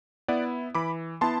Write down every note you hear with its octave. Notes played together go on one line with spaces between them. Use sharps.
B3 E4 D5 F#5
E3 B5 D6
B3 E4 A5 C6